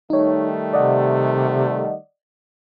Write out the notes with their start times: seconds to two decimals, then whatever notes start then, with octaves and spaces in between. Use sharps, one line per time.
0.10 D#3 G3 A3 D#4 C#5
0.73 C3 D5 D#5 F#5